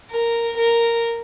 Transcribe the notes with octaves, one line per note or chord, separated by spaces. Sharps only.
A#4
A#4